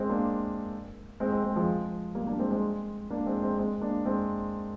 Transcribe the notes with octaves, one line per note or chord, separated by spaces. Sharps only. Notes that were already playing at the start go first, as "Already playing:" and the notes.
Already playing: G#3 C4
A#3 D4
G#3 C4
G#3 C4
G#3 C4
F3 G#3
G3 A#3
A#3 D4
G#3 C4
G#3 C4
A#3 D4
G#3 C4
G#3 C4
G#3 C4
A#3 D4
G#3 C4